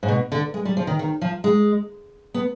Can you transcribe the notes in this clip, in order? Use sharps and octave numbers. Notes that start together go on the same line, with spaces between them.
G#2
B2
D3
G#3
G3
F3
D#3
D#3
F3
G#3
B3